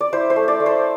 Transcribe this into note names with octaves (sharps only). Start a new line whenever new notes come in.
D5
E4 C5
C5
A3
D5
A3
C5